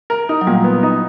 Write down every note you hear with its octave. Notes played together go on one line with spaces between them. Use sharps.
A#4
D#4
F#3
A#2 G3
B3
D#4